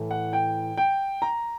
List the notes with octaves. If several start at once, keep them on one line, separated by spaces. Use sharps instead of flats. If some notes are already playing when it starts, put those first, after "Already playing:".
Already playing: A2 E3 A3
F#5
G5
G5
A#5